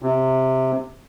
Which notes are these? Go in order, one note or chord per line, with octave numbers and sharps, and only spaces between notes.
C3